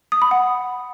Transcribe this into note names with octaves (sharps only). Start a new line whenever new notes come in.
D#6
B5
F#5